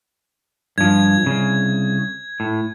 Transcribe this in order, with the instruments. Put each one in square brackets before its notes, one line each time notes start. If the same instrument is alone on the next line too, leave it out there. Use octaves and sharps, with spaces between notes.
[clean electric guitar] G2 F3 [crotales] G#6
[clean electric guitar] C2 C#3
A2